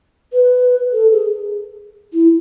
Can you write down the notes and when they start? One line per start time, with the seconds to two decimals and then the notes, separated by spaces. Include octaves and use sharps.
0.33 B4
0.93 A4
1.13 G#4
2.13 E4